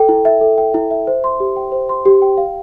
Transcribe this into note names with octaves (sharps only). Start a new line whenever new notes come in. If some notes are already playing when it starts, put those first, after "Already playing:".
Already playing: A4 G5
E4
E5
A4
G5
E4
E5
C5
C6
G4
G5
C5
C6
G4
G5
F5